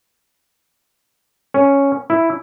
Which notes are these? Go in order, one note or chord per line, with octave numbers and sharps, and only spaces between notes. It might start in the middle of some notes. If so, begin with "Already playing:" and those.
C#4
E4